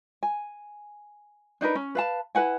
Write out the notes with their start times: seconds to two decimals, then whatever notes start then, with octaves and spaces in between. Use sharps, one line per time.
0.23 G#5
1.61 D4 D#4 A#4 B4
1.75 C#4
1.95 B4 F5 A5
2.35 E4 B4 F#5 G#5